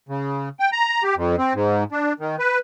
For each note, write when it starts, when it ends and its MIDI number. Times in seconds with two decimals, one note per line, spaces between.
0.09 0.49 49
0.60 0.70 79
0.72 1.03 82
1.03 1.15 67
1.16 1.36 41
1.38 1.53 60
1.54 1.84 44
1.92 2.13 62
2.20 2.36 51
2.39 2.59 71